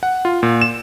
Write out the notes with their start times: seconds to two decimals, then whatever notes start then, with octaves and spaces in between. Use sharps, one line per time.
0.03 F#5
0.25 F4
0.43 A#2
0.61 E7